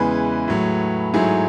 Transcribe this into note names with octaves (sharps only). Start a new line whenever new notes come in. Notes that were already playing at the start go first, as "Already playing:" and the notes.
Already playing: E2 C#3 E3 G#3 G#4 B4
A2 F#3 A3
G#2 F#3 A3 E4 G#4